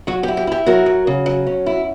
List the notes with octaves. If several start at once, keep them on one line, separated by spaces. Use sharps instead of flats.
F#3 F#4
G4
E4
G4
E4 G4
F#3 F#4 A#4
F#3
C#3
F#3
C#4
E4